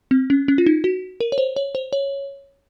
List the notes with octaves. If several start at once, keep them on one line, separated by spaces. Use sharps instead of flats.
C4
C#4
C#4
F4
D#4
F#4
A#4
C#5
C5
C#5
C5
C#5